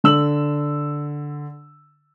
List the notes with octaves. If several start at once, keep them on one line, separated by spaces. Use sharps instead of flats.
D3 E6 F#7